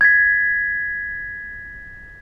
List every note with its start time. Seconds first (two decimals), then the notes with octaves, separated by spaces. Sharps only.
0.01 G#6 A6 B6